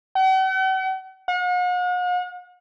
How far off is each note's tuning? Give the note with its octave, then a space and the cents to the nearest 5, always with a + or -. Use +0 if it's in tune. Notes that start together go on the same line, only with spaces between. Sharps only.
F#5 +45
F#5 -45